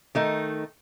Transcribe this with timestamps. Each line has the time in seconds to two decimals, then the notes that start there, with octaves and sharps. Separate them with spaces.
0.15 D#3 A3 D#4